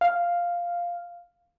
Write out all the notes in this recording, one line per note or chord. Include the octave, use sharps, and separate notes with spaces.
F5